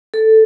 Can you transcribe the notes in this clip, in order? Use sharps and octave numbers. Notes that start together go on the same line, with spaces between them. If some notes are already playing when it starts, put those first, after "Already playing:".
A4